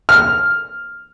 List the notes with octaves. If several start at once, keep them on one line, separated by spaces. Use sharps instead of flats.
F6